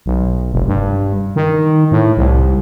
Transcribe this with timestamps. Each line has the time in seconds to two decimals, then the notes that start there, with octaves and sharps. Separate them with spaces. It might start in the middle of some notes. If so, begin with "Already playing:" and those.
0.06 B1
0.53 F1
0.68 G2
1.36 D#3
1.92 A2
2.17 C2